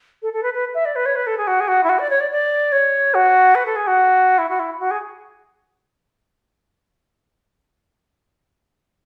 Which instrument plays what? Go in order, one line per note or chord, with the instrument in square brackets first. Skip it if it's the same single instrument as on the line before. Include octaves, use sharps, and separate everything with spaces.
[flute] A4
A4
B4
B4
E5
D5
B4
C#5
B4
A4
G#4
F#4
G#4
F#4
E4
F#4
D5
C#5
D5
D5
C#5
F#4
B4
A4
G#4
F#4
E4
F#4
E4
F#4
G#4